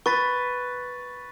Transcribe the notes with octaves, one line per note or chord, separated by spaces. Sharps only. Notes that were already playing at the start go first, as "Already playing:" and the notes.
B4 C#6 A6 B6